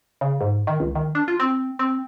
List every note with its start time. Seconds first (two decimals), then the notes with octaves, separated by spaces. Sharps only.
0.21 C#3
0.41 G#2
0.67 D#3
0.80 C#2
0.95 D#3
1.15 D4
1.28 F4
1.40 C4
1.79 C4